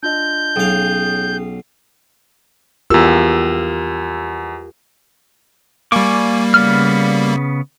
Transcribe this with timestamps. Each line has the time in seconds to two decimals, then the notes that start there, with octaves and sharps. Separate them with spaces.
0.03 D4 F4 D#5 G6
0.56 B1 C#4 G#4 F5 G5
2.90 E2 F4 G4 A#4 E6
5.92 G3 A#3 G#5 C#6 D6
6.54 C#3 B3 F6